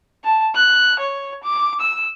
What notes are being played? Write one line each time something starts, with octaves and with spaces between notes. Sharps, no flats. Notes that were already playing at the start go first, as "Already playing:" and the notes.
A5
F#6
C#5
D6
E6